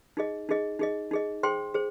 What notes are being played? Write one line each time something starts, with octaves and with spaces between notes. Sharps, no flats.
D#4 G#4 D#5
D#4 G#4 D#5
D#4 G#4 D#5
D#4 G#4 D#5
G#4 C5 G5 C6
G#4 C5